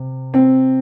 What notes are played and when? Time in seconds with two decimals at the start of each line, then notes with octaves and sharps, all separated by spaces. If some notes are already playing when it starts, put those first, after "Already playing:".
Already playing: C3
0.34 C4